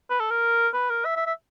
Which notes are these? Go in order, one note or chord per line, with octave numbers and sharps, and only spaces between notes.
B4
A4
A#4
B4
A#4
E5
E5
E5